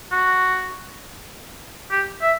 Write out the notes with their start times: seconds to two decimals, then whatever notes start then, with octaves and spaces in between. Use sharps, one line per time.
0.12 F#4
1.91 G4
2.22 E5